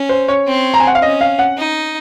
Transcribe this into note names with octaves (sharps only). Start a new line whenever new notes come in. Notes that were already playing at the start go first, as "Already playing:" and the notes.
Already playing: C#4
C5
C#5
C4
A#5
G#5
F#5
F5
C#4 D#5
F5
F#5
D#4